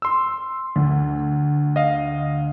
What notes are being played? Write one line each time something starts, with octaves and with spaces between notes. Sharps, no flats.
C6 E6
D2
D#5 F5